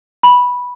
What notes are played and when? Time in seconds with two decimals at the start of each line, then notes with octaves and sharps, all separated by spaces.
0.23 B5